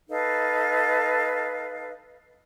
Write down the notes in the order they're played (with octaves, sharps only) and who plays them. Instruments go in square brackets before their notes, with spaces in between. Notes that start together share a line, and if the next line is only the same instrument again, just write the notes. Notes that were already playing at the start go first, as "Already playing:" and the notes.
[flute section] D#4 A4 B4 F5